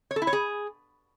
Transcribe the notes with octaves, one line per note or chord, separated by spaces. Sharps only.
C#5
A4
E4
C#5
G#4